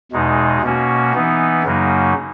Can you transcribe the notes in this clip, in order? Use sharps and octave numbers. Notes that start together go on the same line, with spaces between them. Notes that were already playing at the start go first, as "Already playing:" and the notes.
E2 B2 G#3 D#4
B2 A#3 C#4 F#4
E3 B3 D#4
F#2 C#3 F#3 A#3 D#4